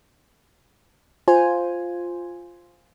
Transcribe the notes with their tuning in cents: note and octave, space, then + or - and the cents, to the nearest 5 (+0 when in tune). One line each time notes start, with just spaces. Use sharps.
F4 +0 C5 +0 G#5 +0